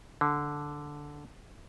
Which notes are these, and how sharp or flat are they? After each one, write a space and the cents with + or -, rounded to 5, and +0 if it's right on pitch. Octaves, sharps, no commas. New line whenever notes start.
D3 -5